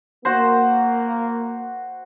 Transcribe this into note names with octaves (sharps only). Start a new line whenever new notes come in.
A#3 F#4 C5